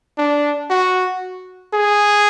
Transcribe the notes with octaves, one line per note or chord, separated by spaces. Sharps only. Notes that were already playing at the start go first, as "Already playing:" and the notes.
D4
F#4
G#4